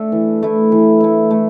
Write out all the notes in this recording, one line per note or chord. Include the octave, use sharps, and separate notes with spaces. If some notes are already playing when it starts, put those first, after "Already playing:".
Already playing: A3 D4 A4
E3
A3 E4
E3
A3 E4
A3